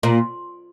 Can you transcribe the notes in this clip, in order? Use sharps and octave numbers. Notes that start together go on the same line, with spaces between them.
A#2